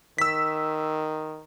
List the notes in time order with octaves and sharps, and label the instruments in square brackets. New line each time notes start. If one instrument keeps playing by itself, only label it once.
[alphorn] D#3 [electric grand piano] E6 B6